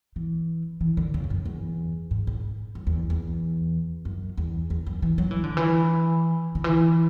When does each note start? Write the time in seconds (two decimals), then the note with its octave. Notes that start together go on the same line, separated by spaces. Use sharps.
0.16 E3
0.81 E3
0.97 D3
1.14 C#3
1.24 E2
1.30 F#2
1.46 E2
2.11 G#2
2.27 G#2
2.75 F#2
2.87 E2
3.10 E2
4.05 F#2
4.38 E2
4.70 E2
4.86 F#2
5.02 E3
5.18 F#3
5.31 E3
5.44 D3
5.57 E3
6.55 D3
6.64 E3